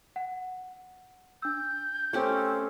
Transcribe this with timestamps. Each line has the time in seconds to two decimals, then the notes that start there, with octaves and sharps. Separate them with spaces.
0.16 F#5
1.42 D4 E6 G6
2.13 A3 C4 C#4 G4